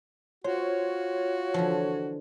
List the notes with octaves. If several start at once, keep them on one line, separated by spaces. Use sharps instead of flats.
F4 F#4 C5 C#5
D3 E3 F3